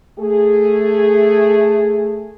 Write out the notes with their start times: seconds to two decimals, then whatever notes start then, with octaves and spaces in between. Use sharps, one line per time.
0.19 A3 G#4